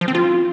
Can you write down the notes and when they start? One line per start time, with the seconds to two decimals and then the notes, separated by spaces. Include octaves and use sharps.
0.01 F3
0.08 C4
0.15 F4